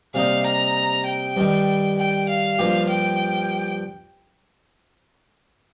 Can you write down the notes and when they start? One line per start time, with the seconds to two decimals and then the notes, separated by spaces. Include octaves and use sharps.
0.14 C3 G3 A#3 D#4 F5
0.45 A#5
1.06 G5
1.37 G2 D#3 G3
1.98 G5
2.29 F5
2.59 G2 F3 A#3 G4
2.89 G5